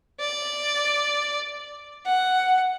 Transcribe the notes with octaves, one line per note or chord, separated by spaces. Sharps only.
D5
F#5